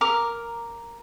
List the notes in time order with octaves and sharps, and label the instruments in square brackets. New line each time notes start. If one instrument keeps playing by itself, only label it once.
[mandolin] A#4 D6